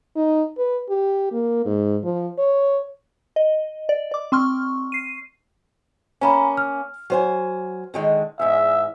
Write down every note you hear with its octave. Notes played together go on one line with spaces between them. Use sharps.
D#4
B4
G4
A#3
G#2
F3
C#5
D#5
D5
D5 D6
C4 C6 C#6 F6
C7 D#7
A#3 C#4 G#5 A#5 B5
F6
F#3 C5 G#5
D3 D#3 G#3
E2 G#2 E5